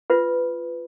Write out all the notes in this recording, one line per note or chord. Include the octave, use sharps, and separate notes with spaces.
F4 B4